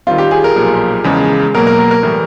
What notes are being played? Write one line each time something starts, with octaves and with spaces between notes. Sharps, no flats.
D#3 G3 C4 F4
G4
G#4
A#4
B1 A#2 F3
E2 C#3 F3 G#3
B2 F#3 A#3 A#4
A#4
A#4
A#4
A2 E3 G3 A#4